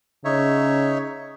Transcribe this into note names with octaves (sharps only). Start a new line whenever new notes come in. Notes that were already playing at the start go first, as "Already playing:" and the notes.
C#3 D#4 C#5 E5